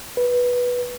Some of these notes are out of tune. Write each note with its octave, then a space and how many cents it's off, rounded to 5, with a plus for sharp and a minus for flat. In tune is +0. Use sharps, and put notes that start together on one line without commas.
B4 -10